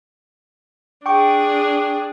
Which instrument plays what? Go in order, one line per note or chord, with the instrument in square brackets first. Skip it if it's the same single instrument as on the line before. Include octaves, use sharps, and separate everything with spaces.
[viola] D4 G#4 [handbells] G5 C#6 D6